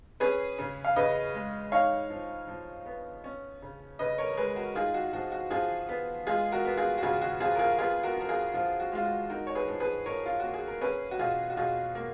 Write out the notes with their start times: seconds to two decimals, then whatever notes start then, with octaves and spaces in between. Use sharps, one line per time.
0.20 C#4 G#4 B4
0.59 C#3
0.84 F5
0.96 C#3 B4 D#5
1.34 G#3
1.72 D#4 C#5 F5
2.10 F3
2.48 F3
2.86 B3
3.24 C#4
3.62 C#3
3.99 C#3 B4 D#5
4.18 A#4 C#5
4.33 A#4
4.37 G#3 G#4 B4
4.56 F#4 A#4
4.75 D#4 F4 G#4
4.94 F#4
5.13 F3 F#4
5.32 F#4
5.50 F3 F4 G#4
5.89 B3
6.27 G#3 F4 G#4
6.52 F#4 A#4
6.65 B3
6.77 F4 G#4
6.98 F#4
7.03 C#3 F4 G#4
7.22 F#4
7.40 F3 F4 G#4
7.56 A#4
7.59 F4 G#4
7.78 B3 F4 G#4
8.03 F#4 A#4
8.16 F3 A#4
8.29 F4 G#4
8.54 F3 F4
8.80 F#4
8.92 G#3 F4
9.05 F#4
9.30 D#4 F#4 A#4
9.47 C#5
9.55 G#4 B4
9.68 F3
9.80 G#4 B4
10.06 F3 A#4 C#5
10.26 F4
10.40 A#3 F#4
10.53 G#4
10.68 A#4
10.81 C#4 G#4 B4
11.11 F#4
11.19 B2 F4 G#4
11.50 F#4
11.57 B2 F4 G#4
11.95 A#3